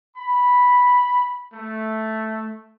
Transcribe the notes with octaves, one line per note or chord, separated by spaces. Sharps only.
B5
A3